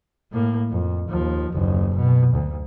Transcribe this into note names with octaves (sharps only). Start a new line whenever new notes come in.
A2 A#3
F2
D#2 F3
F#1 D#2
B2
D2